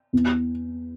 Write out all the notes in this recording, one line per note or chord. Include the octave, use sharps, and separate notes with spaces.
E2